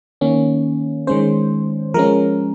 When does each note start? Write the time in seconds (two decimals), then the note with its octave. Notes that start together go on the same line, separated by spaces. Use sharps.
0.21 D#3 A#3 C#4
1.07 D#3 G#3 C#4 C5
1.94 F3 G#3 C#4 A#4